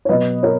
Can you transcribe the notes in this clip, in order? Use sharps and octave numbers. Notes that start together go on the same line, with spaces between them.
C#5
B2 F#3 B4 D#5
A#4 C#5